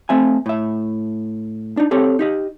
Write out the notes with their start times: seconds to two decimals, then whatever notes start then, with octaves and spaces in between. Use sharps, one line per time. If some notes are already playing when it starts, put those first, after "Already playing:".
0.09 A3 C4 E5 G#5
0.46 A2 E5
1.77 D4 D#4
1.91 C4 G4 A4 C#5
2.19 D#4 G4 D#5